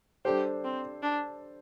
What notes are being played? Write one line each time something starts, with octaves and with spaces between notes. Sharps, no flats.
G3 D4 G4 A4 C5
C4
D4